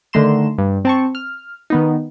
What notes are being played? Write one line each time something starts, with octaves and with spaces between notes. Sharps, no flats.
D3 D#3 A3 A#5 C6 E7
G2
C4 A5 C#6
F6
D#3 B3 D#4